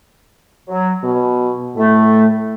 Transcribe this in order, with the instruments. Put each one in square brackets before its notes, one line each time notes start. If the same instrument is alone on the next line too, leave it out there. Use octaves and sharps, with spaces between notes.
[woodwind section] F#3
[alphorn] B2
[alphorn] A2 [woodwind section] A3